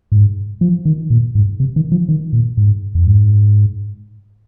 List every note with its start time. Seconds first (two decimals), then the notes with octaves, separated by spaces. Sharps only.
0.12 G#2
0.61 F3
0.85 D#3
1.10 A#2
1.35 G#2
1.60 C3
1.76 D#3
1.92 F3
2.09 D#3
2.33 A#2
2.57 G#2
2.95 F2
3.07 G#2